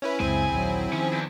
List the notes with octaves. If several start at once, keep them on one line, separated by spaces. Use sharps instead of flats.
C#4 E4 B4
C#2 F#2 C#3 G#3 C4 E4 G#4 G#5
A#1 D#2 F#3
D#3 F3 C#4
E2